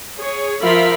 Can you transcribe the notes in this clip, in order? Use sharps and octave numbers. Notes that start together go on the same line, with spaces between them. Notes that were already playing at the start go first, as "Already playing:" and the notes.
G#4 C#5
F3 F4 A#4 E5 F5 B5